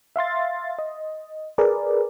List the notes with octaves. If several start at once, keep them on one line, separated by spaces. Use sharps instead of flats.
E5 F5 C6 A6
D#5
G#4 A#4 B4 D5